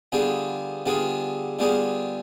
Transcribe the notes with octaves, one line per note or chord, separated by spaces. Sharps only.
D3 G3 B3 F4 G#4
D3 G3 B3 F4 G#4
D3 G3 B3 F4 G#4